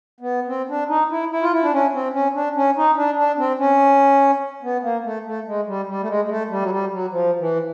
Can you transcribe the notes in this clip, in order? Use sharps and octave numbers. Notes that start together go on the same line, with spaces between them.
B3
C4
D4
D#4
E4
E4
F4
E4
D4
C#4
C4
C#4
D4
C#4
D#4
D4
D4
C4
C#4
B3
A#3
A3
A3
G#3
G3
G3
A3
G#3
G#3
A3
G3
F#3
G3
F#3
F3
E3